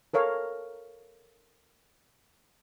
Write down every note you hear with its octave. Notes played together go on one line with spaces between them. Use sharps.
A4 A#4 C#5 F5